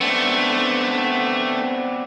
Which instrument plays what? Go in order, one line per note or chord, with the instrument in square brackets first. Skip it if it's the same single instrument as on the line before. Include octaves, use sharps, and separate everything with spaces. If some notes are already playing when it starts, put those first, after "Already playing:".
[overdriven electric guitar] A3 [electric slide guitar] B3 C4 D4